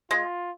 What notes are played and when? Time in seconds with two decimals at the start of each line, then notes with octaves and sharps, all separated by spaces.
0.10 G#3 F4